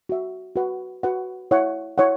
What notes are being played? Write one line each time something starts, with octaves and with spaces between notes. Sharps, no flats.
F#4 E5
F#4 B4 F#5
F#4 B4 F#5
E4 C#5 F#5
E4 C#5 F#5